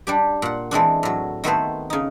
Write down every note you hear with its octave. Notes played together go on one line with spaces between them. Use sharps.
G3 D4 G4
A#2 F#5
E3 G#3 C4 D4
A2 F#3
D#3 A3 B3 C4 B4 C5
C#3 D#4